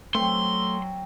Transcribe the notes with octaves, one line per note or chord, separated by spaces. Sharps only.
F#3 A3 C4 C6